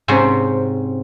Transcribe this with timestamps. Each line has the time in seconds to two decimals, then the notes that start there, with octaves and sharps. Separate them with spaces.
0.08 G#2 C3 C4 C#4 C#5